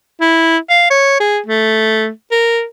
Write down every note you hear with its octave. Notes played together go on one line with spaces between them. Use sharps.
E4
F5
C#5
G#4
A3
A#4